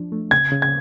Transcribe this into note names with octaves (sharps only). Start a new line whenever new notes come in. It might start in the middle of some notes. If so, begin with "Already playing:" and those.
Already playing: F3 D4
A3
C#3 G#6
C#3
G#6